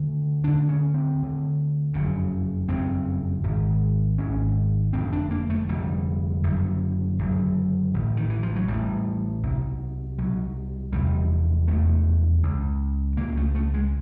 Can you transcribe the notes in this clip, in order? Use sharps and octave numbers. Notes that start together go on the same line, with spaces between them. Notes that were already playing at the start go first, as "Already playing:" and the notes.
Already playing: D2 D3
D2 D3 D4
C#4
C4
D2 D3
F#1 F2 C#3
F#1 F2 C#3 C4
G#1 G#2
G#1 G#2 C#4
F1 F2 D3 C4
D4
A#3
A3
F1 F2 D3 G3
F#1 F#2 D3
F#1 F#2 D3
A1 A2
D#3
E3
F3
F#3
A1 A2 G3
C2 B2
C2 B2 F#3
F1 E2 C3 G3
F1 E2 C3 A3
C#2 C#3
C#2 C#3 A#3
A3
A3
G#3